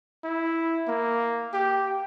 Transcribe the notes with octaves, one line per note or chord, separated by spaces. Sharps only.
E4
A#3
G4